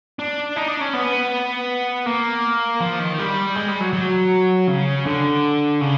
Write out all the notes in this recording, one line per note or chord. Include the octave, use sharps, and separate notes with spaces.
D4
D#4
D4
C#4
B3
A#3
F3
D#3
G3
G#3
G3
F#3
F#3
C#3
D3
C#3